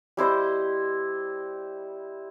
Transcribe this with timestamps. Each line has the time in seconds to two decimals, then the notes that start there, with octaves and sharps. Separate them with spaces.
0.17 G3 E4 C5 D#5